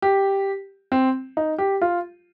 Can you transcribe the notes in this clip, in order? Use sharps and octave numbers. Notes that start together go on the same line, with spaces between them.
G4
C4
D#4
G4
F4